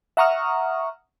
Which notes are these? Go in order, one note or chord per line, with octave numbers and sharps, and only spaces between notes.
E5 F#5 A#5 C#6 D#6 F6